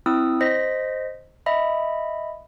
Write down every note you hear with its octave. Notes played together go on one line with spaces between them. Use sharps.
C4 E4 D#6 E6
C5 D#5 A#6 B6
D#5 E5 B5